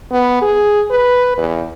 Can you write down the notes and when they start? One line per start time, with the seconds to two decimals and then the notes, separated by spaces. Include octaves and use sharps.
0.11 B3
0.42 G#4
0.90 B4
1.37 E2